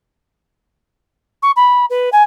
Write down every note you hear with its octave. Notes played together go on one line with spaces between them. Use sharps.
C#6
B5
B4
G#5